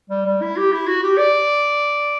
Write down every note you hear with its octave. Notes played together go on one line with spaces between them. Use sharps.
G3
G3
E4
G4
E4
F#4
G4
D5